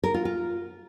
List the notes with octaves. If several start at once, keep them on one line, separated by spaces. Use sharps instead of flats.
A#4
F4
F4